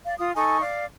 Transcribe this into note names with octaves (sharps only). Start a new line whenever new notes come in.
D5 F5
F4 D#6
D#4 A4 G#5 C#6
D5 F5